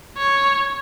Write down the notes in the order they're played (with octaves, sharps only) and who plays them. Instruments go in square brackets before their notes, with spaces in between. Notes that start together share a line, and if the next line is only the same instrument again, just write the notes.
[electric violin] C#5